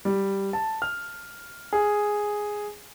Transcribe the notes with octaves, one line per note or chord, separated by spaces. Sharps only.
G3
A5
F6
G#4